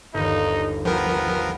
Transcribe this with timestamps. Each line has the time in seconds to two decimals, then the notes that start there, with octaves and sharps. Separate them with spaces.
0.14 G1 D#2 D#4
0.85 F3 B3 A#4 G5